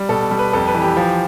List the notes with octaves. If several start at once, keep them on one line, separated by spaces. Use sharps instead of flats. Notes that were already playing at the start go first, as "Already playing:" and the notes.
Already playing: G3
B2 A4
G3
B4
F2 A4
B4
E3
G4
F3